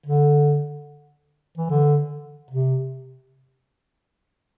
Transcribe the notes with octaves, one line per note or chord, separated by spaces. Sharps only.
D3
E3
D3
C3